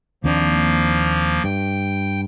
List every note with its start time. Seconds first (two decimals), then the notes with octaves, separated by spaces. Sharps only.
0.24 D#2 F3 A#3 C4 D4
1.44 G2 G5